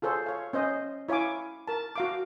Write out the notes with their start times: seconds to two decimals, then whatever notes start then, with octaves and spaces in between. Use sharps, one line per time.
0.02 F4 G#4 A4 C5 C#5
0.26 C#5 F5
0.53 C#4 C5 D#5
1.09 E4 C#5 F5 G#5 D6
1.68 A#4 A5
1.96 F#4 F5 D6